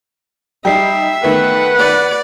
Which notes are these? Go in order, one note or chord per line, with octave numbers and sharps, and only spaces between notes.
G3 D#4 G4 E5 G5 C7
D#3 A3 B3 B4 F#5
D5